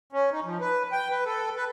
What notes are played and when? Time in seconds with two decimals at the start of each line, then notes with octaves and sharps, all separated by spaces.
0.13 C#4
0.32 D#4
0.45 F3
0.61 B4
0.92 G5
1.10 B4
1.25 A4
1.56 B4